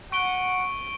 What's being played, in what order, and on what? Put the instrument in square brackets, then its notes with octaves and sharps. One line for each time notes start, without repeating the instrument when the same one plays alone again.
[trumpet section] F#5 [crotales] C#6 D7 G7